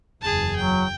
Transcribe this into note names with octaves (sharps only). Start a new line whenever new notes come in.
F#1 E2 G#4 A5
F#3 G5